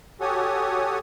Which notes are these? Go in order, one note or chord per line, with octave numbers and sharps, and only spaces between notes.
F#4 G4 A4 C#5 G#5 D#6